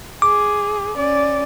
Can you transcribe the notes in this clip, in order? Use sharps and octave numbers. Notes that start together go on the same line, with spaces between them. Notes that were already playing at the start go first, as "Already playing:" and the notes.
G#4 D6
C#4 D5